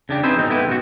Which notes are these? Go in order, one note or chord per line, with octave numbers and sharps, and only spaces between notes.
C#3 D4 G4
C4 D#4 E4 G#4 B4 C5
G#2 B2 G#3 C4 D#4
A3 B3 E4 G4 B4
F#2 B2 F#4